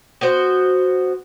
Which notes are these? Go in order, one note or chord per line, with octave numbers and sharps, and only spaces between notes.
B3 F#4 C5